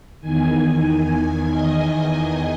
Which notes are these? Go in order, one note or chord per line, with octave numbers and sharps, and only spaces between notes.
E2 D#3 G#5
D#5